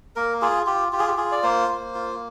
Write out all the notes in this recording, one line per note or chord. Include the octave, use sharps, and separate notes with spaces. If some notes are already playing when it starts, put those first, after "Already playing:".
A#3 A#4
F4 G#4
F4 G4
F4 G4
G#4
G4
F4 G#4
D5
A#3 C5
A#3
F4